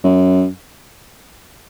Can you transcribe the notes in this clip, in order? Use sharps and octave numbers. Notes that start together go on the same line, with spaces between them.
F#2